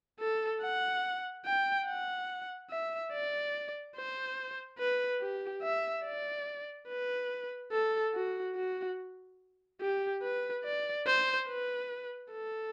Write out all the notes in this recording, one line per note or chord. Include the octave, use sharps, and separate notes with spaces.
A4
F#5
G5
F#5
E5
D5
C5
B4
G4
E5
D5
B4
A4
F#4
F#4
G4
B4
D5
C5
B4
A4